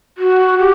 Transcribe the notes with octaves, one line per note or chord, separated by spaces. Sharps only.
F#4
G4